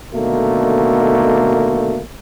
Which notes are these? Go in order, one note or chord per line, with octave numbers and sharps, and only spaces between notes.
B2 D3 D#3 A3 A#3